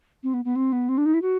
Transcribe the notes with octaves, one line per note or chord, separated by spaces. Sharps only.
C4
B3
B3
C4
B3
C4
D4
D#4
E4
F#4